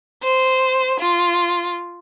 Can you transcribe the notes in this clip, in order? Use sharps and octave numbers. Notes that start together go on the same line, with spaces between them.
C5
F4